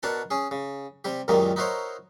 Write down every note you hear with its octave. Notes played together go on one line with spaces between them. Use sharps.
B2 D4 A#4 F#5 A5
C#4 G#4
C#3
C3 G3 G4
C#2 F#2 A#2 D#3 G3 A#3
D#4 E4 F#4 A#4 C5 C#5